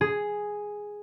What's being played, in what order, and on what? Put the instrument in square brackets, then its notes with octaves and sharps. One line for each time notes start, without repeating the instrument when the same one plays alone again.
[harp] G#4